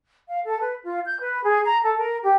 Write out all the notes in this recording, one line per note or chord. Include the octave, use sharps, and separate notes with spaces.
F5
A4
B4
F4
G6
B4
G#4
A#5
A4
A#4
G4